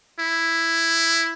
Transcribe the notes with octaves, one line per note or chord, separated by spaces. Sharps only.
E4